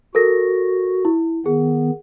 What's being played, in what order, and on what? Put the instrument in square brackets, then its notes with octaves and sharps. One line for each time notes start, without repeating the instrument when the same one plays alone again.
[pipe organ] F#4 [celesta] A4 A#4 A#6
[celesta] E4
[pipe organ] D#3 B3 [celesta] G#4